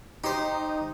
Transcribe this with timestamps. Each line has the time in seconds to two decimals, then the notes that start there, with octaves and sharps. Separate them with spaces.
0.24 D#4 G4 C5